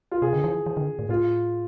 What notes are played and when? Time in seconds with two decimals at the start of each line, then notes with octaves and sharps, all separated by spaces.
0.12 F4
0.22 C3 G#4
0.33 D3
0.44 E3
0.66 E3
0.77 D3
0.99 A2
1.09 A2 F4